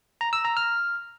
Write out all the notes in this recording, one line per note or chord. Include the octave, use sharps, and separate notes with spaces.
A#5
E6
A#5
F6